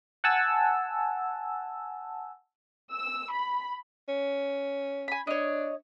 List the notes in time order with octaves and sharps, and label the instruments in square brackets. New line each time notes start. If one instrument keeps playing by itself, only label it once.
[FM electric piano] F#5 G#5 A5 E6
[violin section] E6
B5
[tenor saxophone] C#4
[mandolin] G#5 B5
[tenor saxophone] D4 [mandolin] C#5 D#5